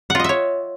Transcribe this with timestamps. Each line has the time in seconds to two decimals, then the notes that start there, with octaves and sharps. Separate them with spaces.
0.10 F#5
0.15 F4
0.20 D#5
0.24 E5
0.29 C#5